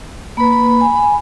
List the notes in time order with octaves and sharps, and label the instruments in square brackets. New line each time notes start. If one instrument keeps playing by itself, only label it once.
[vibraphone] A#3 B4 [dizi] B5
[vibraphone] G#5